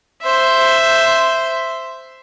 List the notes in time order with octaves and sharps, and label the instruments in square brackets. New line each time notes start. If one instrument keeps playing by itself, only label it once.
[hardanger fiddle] C5 E5